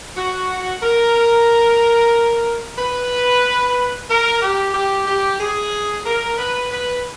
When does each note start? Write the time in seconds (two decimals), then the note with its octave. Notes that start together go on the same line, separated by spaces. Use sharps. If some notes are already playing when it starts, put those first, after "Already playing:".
0.17 F#4
0.83 A#4
2.78 B4
4.10 A#4
4.42 G4
4.74 G4
5.07 G4
5.40 G#4
6.06 A#4
6.38 B4
6.71 B4